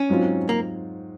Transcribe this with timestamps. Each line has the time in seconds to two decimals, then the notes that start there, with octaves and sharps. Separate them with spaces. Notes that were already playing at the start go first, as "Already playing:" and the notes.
Already playing: C#4
0.09 G#2 F#3 C4 F4
0.49 A#3